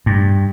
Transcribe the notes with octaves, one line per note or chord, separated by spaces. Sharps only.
G2